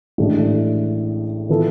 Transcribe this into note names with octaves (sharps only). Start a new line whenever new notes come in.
A1 A2 G#3 D4
E3 B3 F4 A4